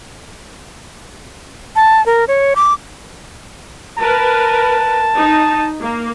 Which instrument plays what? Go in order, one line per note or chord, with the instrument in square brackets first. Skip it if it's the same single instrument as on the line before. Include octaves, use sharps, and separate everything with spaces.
[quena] A5
A#4
C#5
D6
[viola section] A#4 B4 [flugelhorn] A5
[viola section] D#4
A#3